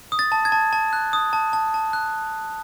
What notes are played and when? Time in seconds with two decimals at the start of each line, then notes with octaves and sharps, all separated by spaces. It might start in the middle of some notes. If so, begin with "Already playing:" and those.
0.12 D#6
0.19 A6
0.32 A5
0.45 G#6
0.52 A5
0.73 A5
0.93 F#6
1.13 D#6
1.33 A5
1.53 A5
1.74 A5
1.93 F#6